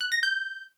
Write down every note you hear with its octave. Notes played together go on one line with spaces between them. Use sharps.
F#6
A#6
G6